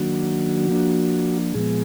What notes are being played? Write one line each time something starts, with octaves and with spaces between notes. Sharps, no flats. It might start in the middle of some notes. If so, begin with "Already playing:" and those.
Already playing: D#3 F#3 A#3 D4 F#4
F3 A#3 D4
A#2 F3 G#3 B3 G#4